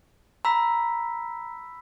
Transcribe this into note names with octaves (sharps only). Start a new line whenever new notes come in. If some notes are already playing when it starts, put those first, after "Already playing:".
A#5 B5 E6 B6